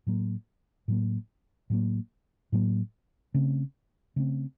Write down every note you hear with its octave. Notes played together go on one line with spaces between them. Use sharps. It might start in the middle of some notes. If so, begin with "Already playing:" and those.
A2 F#3 A#3
A2 F#3 A#3
A2 F#3 A#3
A2 F#3 A#3
C#3 A3 C4
C#3 A3 C4